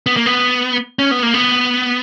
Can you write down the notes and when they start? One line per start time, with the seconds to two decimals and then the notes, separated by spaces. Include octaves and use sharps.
0.06 B3
0.17 A#3
0.26 B3
0.99 C#4
1.11 B3
1.23 A#3
1.34 B3